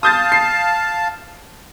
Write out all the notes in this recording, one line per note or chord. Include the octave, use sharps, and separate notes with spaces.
F5 A5 D#6 G6 A6
C7